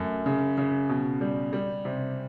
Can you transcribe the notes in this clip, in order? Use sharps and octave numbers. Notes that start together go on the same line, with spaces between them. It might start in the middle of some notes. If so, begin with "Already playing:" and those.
Already playing: F#2 A3
C#3
C#3
B2
G3
G3
C3